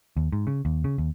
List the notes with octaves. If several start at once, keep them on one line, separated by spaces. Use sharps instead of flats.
D#2
G#2
C#3
D#2
C#3
D#2